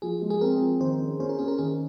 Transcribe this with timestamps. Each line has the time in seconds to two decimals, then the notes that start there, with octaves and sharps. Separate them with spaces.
0.02 F3 G#4
0.22 G#3
0.30 G#4
0.41 C4 A#4
0.61 F3
0.80 D#3 C5
1.00 C#4
1.20 C#4 C5
1.29 A#4
1.39 C#4 G#4
1.48 A#4
1.58 D#3 G#4